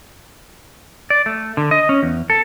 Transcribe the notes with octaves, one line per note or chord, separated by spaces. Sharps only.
D5
A3
D3
D#5
C#4
E2
A4